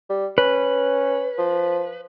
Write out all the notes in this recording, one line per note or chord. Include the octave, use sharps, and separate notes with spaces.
G3
C#4 B4
F3